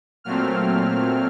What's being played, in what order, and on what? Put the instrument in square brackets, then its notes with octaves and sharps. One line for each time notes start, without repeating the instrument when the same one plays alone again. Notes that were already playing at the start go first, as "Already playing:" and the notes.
[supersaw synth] A#2 F#3 A3 C4 F6